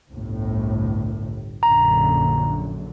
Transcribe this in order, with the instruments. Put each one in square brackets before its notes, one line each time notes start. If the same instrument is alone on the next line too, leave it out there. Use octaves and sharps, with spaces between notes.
[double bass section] G1 C2 A2
[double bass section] A#1 F#2 D3 [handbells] A#5